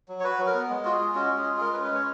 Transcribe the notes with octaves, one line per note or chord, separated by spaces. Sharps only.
F#3
C#5
F#4 B4
F#3
A#4
B3
G#3
F4 F#4
G#4
G#3
C#4 F#4
G#3
G#4
F4
G#4
G#3 A#4
B4
C#4
B4
G#3 C#5